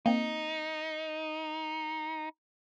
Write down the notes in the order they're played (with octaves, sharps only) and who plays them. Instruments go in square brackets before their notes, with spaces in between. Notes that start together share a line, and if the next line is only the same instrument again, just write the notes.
[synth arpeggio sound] A#3 C4 [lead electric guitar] D#4